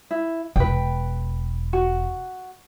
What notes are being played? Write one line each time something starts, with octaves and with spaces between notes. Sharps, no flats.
E4
E1 B4 G5
F#4